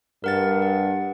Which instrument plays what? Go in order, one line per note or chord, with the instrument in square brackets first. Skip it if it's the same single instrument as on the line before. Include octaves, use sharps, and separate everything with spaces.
[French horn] G2 [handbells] A#4 F#5 A6
[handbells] F#5